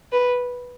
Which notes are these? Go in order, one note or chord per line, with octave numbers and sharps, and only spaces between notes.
B4